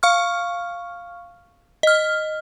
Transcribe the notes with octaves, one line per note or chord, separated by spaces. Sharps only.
F5 C#6 F6
D#5 F6